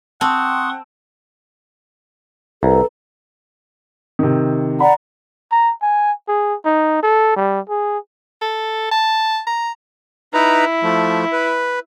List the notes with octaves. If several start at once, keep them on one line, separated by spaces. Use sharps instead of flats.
C4 F#5 A5 C6 C#6 D#6
C2 A4 B4 A#5
C3 D#3
D5 F#5 A#5 B5
A#5
G#5
G#4
D#4
A4
G3
G#4
A4
A5
A#5
D#4 E4 B4 A#5
F3 A3
B4